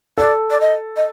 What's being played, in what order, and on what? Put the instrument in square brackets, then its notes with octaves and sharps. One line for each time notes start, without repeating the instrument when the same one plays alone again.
[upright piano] A4 [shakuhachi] D5
[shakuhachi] D5
D#5
D#5